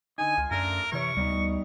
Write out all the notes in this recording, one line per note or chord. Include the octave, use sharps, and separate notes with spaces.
D3 D#4 G#5
C#2 F4
F#2 A3 D4 F4 A#4
C3 E3 C#5 C#6
D2 G3 B3 D#4